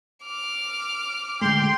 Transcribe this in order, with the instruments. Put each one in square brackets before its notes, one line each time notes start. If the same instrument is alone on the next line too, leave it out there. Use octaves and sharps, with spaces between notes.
[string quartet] D6 F6
[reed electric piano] D3 G#3 A3 [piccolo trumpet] G5 [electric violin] C6